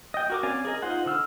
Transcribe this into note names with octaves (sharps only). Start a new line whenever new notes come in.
D#5 G5
F#4 A#4 D6
C4 C#4 D5 F5 G#5
G#4 A#4 D#5
D#4 F4 C5 F#5
D3 E6 F6